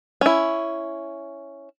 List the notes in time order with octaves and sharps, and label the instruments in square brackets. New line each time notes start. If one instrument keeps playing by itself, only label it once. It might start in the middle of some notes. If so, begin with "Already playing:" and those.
[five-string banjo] C#4 E4